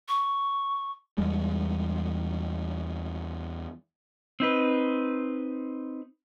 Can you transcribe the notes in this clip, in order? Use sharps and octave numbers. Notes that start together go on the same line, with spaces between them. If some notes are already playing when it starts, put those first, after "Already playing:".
C#6
E2 G3 G#3
C4 D#4 B4